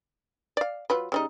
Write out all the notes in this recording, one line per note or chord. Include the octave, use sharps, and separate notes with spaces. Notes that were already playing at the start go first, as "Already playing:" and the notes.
D5 F5
F#3 F4 B4
C#3 G3 D#4